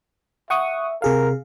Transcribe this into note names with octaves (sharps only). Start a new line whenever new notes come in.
E5 F#5 C#6 D#6
C3 G#4 A#4 F5